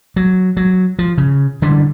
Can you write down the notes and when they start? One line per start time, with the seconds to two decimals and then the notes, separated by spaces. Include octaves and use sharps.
0.16 F#3
0.57 F#3
0.99 F3
1.18 C#3
1.62 D3 E3 G3 D4